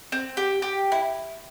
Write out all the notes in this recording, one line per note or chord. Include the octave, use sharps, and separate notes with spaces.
C4
G4
G4
E4